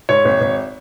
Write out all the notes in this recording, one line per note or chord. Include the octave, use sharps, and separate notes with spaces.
G#2 C#5
G#1
G#1